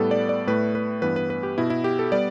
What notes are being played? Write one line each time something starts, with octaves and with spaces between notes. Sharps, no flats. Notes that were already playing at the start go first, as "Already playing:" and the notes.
Already playing: A2 G3 B3 A4
D5
D5
A2 A3 B4
B4
G2 E3 B3 B4
B4
B4
G4
B2 B3 E4
E4
G4
A4
G3 B3 D5